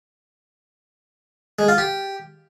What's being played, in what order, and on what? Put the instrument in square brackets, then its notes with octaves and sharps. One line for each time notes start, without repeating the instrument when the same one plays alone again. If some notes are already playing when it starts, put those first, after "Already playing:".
[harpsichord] G#3
F4
G4